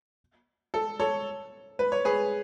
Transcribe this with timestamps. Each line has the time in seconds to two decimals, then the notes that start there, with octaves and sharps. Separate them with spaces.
0.74 A4
0.99 A4 C#5
1.79 B4
1.92 C#5
2.05 G#4 B4